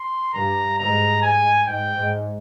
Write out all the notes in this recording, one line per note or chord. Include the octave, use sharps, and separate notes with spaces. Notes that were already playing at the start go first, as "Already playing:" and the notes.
Already playing: C6
G2 A#5
G#2 A#5
G#5
G#2 G5
G#2